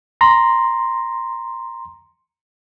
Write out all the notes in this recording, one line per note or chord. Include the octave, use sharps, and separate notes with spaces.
A#5 C6 A#6